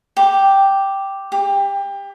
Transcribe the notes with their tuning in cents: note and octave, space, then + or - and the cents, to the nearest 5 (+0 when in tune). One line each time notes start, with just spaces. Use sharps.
G4 +0
G4 +25